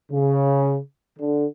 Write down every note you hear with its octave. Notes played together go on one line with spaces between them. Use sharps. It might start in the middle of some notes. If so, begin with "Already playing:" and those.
C#3
D3